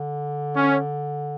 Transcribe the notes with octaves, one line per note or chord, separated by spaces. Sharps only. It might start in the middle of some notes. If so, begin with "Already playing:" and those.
Already playing: D3
C#4